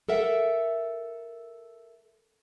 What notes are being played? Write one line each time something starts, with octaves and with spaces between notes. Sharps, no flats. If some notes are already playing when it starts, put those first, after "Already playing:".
A4 A#4 E5 F#5